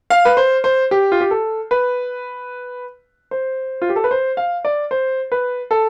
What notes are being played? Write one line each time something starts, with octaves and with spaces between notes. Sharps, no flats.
F5
B4
C5
C5
G4
F4
G4
A4
B4
C5
F4
G4
A4
B4
C5
F5
D5
C5
B4
A4